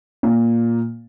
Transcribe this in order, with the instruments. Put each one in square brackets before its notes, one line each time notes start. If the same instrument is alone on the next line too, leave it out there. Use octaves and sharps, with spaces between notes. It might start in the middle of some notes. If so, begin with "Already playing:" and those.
[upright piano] A#2